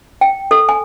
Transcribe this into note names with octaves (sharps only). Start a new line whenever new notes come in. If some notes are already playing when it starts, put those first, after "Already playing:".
G5
A4
G#5